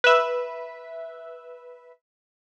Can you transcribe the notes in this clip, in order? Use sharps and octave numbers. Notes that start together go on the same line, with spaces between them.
B4 E5